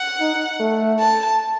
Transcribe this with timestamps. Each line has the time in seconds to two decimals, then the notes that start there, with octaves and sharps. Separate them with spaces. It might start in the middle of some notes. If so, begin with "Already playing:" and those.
Already playing: F#5
0.20 D#4
0.60 A3
0.99 A5